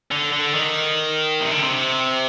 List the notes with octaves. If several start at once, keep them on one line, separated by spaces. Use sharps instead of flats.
D3
D3
D#3
C3
D3
C3